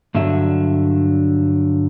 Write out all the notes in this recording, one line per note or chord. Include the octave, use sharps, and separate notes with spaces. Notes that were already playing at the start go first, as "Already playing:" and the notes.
G2 D3 F#3 E5